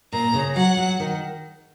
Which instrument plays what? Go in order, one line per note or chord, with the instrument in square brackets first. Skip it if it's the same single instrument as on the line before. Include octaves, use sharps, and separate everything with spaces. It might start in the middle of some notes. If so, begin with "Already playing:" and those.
[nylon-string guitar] A#2 [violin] A#5
[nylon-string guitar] C#3
[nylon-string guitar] F#3 [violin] F#5
[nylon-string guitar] F#3
D#3